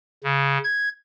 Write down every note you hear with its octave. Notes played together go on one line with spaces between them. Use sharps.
C#3
G#6